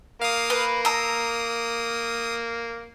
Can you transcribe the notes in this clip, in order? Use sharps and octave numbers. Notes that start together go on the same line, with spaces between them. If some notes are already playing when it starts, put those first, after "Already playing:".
A#3 F5 D#6
B4
A#5 D#6 E6